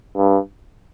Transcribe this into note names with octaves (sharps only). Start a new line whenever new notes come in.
G2